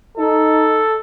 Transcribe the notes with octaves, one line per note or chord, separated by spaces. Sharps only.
D#4 A4